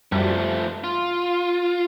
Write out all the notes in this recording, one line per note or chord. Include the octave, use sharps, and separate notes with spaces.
F#2 F3 G3 A3
F4